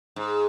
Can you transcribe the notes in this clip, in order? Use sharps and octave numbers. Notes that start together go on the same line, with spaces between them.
G#2